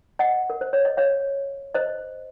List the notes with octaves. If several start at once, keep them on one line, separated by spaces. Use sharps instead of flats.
D#5 F#5
A#4
C5
C#5
D#5
C#5 F5
C5 D#5